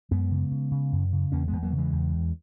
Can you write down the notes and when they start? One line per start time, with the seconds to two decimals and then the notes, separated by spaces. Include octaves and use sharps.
0.11 F#2 G#3 B3
0.31 C#3
0.51 C#3
0.71 C#3
0.92 F#2
1.13 C#3
1.32 E2 A#3 C#4
1.48 E2 G#3 B3
1.63 F#3 A#3
1.73 C#3
1.78 E3 G#3
1.93 E2
2.13 E2